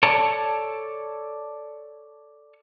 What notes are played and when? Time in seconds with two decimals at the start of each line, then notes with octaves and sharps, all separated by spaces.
0.03 A4 C#5 D5 A5